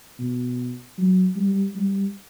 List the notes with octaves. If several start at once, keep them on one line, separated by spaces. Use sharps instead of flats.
B2
F#3
G3
G3